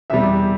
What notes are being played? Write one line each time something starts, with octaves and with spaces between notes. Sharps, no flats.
E2 C3 G3 E5